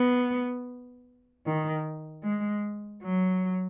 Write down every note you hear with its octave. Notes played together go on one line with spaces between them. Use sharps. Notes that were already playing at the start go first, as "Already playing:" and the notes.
Already playing: B3
D#3
G#3
F#3